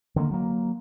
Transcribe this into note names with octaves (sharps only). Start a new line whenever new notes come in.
D3 D#3 G#3 A#3
F#3 A#3